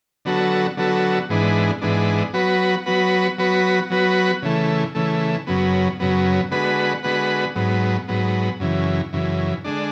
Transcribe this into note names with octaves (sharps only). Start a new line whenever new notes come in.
D3 F#3 B3 F#4 A4
D3 F#3 B3 F#4 A4
G#2 E3 G#3 B3 D4
G#2 E3 G#3 B3 D4
F#3 B3 F#4 B4
F#3 B3 F#4 B4
F#3 B3 F#4 B4
F#3 B3 F#4 B4
C#3 E3 A3
C#3 E3 A3
F#2 C#3 F#3 B3
F#2 C#3 F#3 B3
D3 G#3 B3 F#4 B4
D3 G#3 B3 F#4 B4
G#2 F#3 B3
G#2 F#3 B3
F#2 C#3 E3
F#2 C#3 E3
D3 G#3 D4